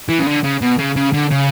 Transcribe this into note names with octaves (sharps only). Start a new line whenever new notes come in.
E3
C#3
D3
C#3
B2
C#3
C#3
D3
C#3